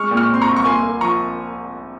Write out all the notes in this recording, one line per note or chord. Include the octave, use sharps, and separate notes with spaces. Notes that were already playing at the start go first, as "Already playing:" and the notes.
Already playing: G#3 C#6 F6
A#2
C#6 F6
C4 C6
A#5 C#6
C2
C#6
A#3 G#5 C6
A#3
F3 A#5 C#6